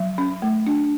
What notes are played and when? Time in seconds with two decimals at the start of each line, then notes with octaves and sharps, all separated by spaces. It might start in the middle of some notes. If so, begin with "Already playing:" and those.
Already playing: F#3
0.18 C#4
0.42 A3
0.67 D4